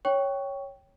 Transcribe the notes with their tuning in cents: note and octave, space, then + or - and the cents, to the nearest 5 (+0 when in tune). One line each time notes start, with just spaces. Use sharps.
C#5 +0 G5 -5 C#6 +5